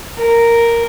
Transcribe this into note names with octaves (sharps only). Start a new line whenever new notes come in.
A#4